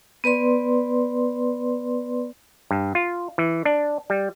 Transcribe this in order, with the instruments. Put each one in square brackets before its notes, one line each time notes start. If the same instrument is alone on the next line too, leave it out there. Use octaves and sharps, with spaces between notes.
[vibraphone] B3 B4 D5 C6
[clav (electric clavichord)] G2
F4
E3
D4
G3